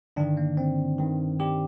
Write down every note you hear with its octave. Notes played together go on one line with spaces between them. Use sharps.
G2 D3 D#3 D4
A#3
C4
G2 D#3
G3 G4